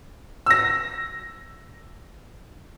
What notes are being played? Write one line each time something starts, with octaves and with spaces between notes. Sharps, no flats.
E6 A#6